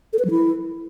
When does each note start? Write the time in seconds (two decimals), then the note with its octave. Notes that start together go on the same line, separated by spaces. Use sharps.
0.13 A4
0.19 B4
0.25 F#3
0.31 E4